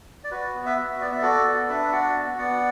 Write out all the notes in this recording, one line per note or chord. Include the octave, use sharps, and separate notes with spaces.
D5
F#4 B4
B3
B4 E5
F#4
B3 D5
E5
F#4 A4 D5
B3
D4 B4 E5
F#4 D5 F#5
B3
B3 D5 F#5